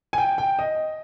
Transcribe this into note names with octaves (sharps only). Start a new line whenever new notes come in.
G#5
G5
G5
D#5